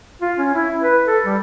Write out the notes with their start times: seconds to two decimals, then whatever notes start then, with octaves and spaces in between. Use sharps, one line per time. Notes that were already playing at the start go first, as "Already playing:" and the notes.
0.22 F4
0.38 C#4
0.54 E4
0.81 B4
1.07 A4
1.26 G3